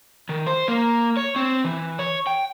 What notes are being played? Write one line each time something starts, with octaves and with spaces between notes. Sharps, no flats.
D#3
C5
A#3
C#5
C4
E3
C#5
G5